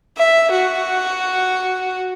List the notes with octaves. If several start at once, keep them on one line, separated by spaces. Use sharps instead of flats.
E5
F#4